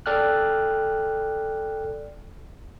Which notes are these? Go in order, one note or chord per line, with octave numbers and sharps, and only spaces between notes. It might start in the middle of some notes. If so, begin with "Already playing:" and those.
A4 D5 G5 F6 F#6